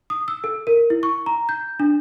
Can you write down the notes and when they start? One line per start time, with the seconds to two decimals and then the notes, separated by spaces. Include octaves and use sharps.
0.10 D#6
0.28 E6
0.44 A4
0.67 A#4
0.90 E4
1.03 C#6
1.26 A#5
1.49 G6
1.80 D4